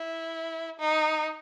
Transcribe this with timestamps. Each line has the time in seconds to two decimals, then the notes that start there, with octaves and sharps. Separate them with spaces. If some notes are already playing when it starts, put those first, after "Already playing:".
Already playing: E4
0.79 D#4